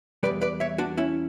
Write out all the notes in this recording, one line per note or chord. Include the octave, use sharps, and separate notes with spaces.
E2 B2 G3 B4 D5
B4 D5
C#5 E5
D4 F#4
C#4 E4